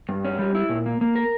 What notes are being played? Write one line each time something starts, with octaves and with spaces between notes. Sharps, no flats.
G2
C#4
G3
E4
A#2
A#3
A#3
A#4